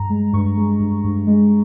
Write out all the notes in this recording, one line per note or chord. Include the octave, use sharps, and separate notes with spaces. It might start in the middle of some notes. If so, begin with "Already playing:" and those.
Already playing: G2 A#5
G#3
G2 C#6
G#3
G2
G2
G#3